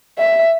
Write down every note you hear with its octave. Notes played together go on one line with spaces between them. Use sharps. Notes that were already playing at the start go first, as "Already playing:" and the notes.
E5